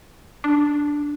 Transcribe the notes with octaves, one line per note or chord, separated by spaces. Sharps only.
D4